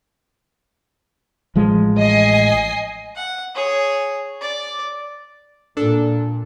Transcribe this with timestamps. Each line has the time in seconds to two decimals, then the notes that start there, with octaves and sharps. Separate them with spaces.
1.55 A1 F3 G#3
1.98 D#5 G#5 C7
3.16 F#5
3.55 G#4 C#5
4.41 D5
5.77 A#2 D4 A4